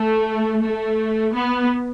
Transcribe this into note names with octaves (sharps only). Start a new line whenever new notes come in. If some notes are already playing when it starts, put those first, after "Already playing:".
Already playing: A3
A3
B3